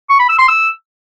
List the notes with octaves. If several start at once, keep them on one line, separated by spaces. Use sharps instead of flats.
C#6
B5
E6
C6
E6